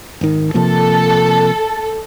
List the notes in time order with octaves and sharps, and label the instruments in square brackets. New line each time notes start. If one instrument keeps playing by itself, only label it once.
[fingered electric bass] G#1 D#3
[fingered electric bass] C3 F3 A#3 [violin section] A4